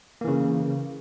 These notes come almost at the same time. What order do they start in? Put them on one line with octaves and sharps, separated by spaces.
A#3 E3 C#3